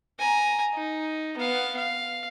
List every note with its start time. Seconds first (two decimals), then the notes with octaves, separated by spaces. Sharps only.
0.19 G#5 A#5
0.74 D#4
1.37 B3 F5
1.76 F5